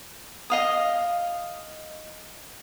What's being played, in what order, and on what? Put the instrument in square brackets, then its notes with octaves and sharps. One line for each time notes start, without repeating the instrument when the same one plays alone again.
[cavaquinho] D#5 F5 D#6